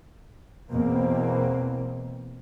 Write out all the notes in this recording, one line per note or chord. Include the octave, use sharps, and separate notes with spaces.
E2 B2 A#3 C4